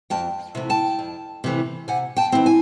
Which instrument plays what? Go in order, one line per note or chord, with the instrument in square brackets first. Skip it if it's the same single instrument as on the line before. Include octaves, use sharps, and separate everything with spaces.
[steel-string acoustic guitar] F2 G5 A5
C3 E3 A3
G5 A5
F2
C3 E3 A3
C3 F#5 G#5
G5 A5
E3 G#3 C4 E4
G#5